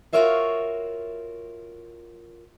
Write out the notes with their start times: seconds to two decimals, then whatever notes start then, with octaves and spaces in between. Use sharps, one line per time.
0.13 F4 F#4 A#4 C#5 E5 F5